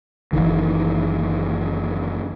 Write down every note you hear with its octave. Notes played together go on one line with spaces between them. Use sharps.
F#1 B1 D#3 E3